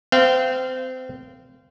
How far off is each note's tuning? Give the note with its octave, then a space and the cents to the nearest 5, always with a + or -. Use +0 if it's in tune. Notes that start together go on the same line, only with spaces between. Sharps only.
C4 -25 F5 -20